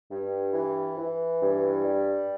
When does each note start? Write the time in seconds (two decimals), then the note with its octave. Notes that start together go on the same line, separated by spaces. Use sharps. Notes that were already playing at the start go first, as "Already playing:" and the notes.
0.09 G2
0.53 E3
0.97 E3
1.41 G2
1.85 G3